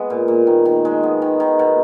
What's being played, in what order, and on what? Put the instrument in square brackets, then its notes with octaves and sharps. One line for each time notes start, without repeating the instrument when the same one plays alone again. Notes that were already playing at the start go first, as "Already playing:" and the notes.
Already playing: [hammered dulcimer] G#3 B3
A#2
A#2
D#3
D#3
G#3
B3
D#3
D#3
B2